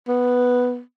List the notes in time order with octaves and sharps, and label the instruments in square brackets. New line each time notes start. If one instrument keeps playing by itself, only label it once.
[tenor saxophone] B3